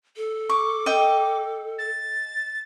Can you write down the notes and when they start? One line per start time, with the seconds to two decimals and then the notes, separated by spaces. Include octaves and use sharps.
0.17 A4
0.49 C#6 D6
0.86 D#5 G5
1.78 A6